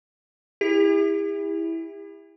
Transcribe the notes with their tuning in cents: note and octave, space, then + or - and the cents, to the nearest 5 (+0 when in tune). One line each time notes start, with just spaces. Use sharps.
E4 -5 G4 +45